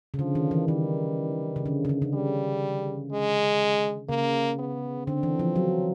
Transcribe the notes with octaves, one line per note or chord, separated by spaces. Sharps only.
C#3
D3 F3
D#3
E3
D#3 G3
C#3
D3
C#3
D3
C#3
G3
G#3
C#3 A#3
B3
D3 C4
E3
F3
F#3